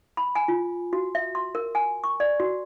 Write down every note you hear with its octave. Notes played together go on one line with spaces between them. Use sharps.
B5
G#5
F4
F#4
E5
C6
A#4
G#5
C#6
D5
F#4